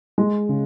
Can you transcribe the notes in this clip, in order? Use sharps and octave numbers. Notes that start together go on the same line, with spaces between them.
G#3
C#3